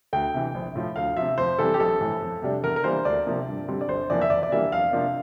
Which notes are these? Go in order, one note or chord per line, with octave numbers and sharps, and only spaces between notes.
D2 G5
C3 E3
A#1
A2 F3
D2 F5
C3 F3 E5
F2 C5
E3 G3 C4 A4
G4
A#1 A4
A2 E3
F2
C3 G3 D4
E2 A#4
A#4
E3 G3 A#3 D4 C5
D2 D5
C3 F3 A#3
G2
D3 G3 C4
D5
G1 C5
F2 E3 A#3 D5
E5
E2 D5
D5
E3 G3 A#3 D4 E5
F2 F5
C3 F3 A#3 D4